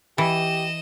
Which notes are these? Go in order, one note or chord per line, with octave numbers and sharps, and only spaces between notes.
E3 G4 D#5 E7